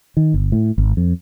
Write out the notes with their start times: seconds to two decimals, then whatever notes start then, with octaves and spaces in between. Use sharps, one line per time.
0.17 D#3
0.34 G1
0.52 A2
0.78 G#1
0.97 F2